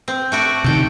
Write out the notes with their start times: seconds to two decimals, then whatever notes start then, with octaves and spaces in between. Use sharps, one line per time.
0.08 C4
0.32 A3 F#4 D5
0.64 C3 D#3 G5 A5